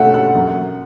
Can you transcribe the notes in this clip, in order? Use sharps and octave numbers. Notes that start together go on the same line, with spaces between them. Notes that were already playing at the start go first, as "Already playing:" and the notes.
Already playing: B2 A3 C#4 E5 F#5
F#5
F#2